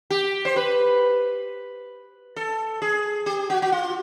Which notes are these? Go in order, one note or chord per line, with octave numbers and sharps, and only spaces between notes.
G4
C5
B4
A4
G#4
G4
F#4
F#4
F4